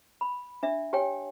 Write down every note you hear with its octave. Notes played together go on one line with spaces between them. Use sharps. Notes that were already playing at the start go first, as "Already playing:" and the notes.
B5
D4 E5
G4 C#5 G5 G#5